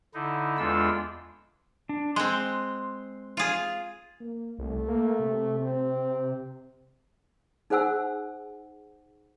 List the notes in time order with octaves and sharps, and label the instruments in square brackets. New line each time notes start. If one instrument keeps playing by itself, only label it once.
[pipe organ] D3 D#4 E4
E2 G#3 D4 F4 A4 E6
[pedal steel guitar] D4
[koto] G#3 C4 [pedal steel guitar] C6 F#6
[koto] F4 G#4
[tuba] A#3
[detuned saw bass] C2 [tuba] A3
[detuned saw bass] A#3
C3
[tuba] C4
[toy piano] D#4 G#4 C5 F#5 G#5 E6